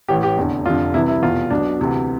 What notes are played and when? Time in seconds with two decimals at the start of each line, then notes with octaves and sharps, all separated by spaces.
0.08 A1 A2 E3 G4
0.23 G4
0.37 F1 E2 D3
0.66 F1 F2 D3 F4
0.94 C2 C3 E3 E4
1.08 E4
1.22 F1 E2 B2 F4
1.50 B1 B2 D4
1.80 D2 C3 E3